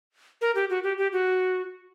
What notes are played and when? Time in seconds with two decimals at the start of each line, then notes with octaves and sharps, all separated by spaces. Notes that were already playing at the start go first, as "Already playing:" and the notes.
0.41 A#4
0.55 G4
0.70 F#4
0.83 G4
0.98 G4
1.12 F#4